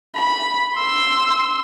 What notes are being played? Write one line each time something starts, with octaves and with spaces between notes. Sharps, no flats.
B5
C6 E6